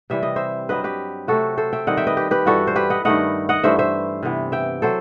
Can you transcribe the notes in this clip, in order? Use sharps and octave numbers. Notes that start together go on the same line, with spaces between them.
C3 E3 G3 C4 E5
D#5
C5 E5
G2 F#3 C4 B4 D#5
G4 B4
C3 F#3 A3 C4 F#4 A4
A4 C5
E5 G5
D#3 G3 C4 D#5 F#5
E5 G5
B4 D#5
G4 B4
G4 B4
G2 E3 G3 F#4 A4
C5
G4 B4
D#5 F#5
G2 D#3 A3 D#5 F#5
D#5 F#5
G2 E3 A3 C5 E5
C5 E5
C3 E3 B3
E5 G5
F#3 A4 C5